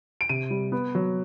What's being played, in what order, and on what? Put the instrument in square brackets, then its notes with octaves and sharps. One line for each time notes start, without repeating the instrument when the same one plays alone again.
[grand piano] D7
C3 D#7
G3
B3
F#3